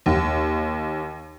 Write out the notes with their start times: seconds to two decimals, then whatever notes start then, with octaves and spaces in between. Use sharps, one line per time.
0.06 D#2